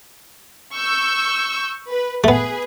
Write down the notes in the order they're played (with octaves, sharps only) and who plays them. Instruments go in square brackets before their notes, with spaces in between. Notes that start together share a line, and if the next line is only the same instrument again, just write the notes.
[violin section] C#6 E6 G6
B4
[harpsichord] A3 B3 [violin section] G#4 B4